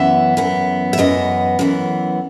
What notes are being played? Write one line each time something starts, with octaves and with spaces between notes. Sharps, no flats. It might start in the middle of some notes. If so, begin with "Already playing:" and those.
Already playing: F#2 E3 B3 E5
F#2 E3 B3
E5
F#2 E3 B3 D#5
F#2 E3 B3